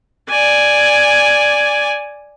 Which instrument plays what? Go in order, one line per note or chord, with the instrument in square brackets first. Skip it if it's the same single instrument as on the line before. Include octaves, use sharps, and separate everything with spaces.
[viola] D5 G#5